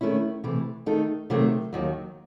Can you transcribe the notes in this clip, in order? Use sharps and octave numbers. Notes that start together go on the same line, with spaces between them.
D#3 A3 C#4 E4
C3 E3 A3
D#3 A3 D#4 A4
C3 D#3 F#3 A3
D#2 D#3 F#3